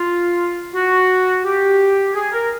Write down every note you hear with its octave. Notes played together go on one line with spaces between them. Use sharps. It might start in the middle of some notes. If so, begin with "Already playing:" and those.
Already playing: F4
F#4
G4
G#4
A#4